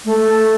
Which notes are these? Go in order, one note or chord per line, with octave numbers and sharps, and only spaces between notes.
A3